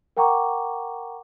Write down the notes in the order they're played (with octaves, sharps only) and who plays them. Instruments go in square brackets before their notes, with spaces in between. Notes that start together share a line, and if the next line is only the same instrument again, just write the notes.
[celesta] A#4 F#5 G5 A#5 C#6 D6